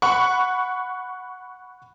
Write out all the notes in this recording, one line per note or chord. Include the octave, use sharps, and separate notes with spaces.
F#5 B5 C#6